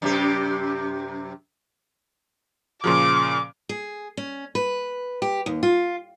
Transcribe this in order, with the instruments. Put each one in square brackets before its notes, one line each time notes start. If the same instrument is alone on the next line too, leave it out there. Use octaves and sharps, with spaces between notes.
[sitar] F#2 C3 G4
[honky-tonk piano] A#2 C#3 F3 [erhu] D6
[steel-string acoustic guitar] G#4
C#4
B4
G4
D#2
F4